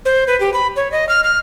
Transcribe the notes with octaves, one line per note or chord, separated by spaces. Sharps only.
C5
B4
G4
B5
C#5
D#5
F6
F6